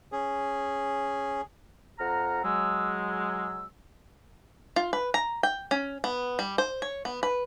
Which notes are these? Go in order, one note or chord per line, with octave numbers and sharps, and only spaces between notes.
C#4 G#4
F2 F#5 A#5 F6
F#3 G#3 E6
E6
F4
B4
A#5
G5
C#4
B3
G3
C5
C#5
B3
B4